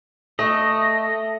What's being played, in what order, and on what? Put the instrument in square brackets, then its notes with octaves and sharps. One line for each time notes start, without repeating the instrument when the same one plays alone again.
[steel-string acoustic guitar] A3 [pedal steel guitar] D#5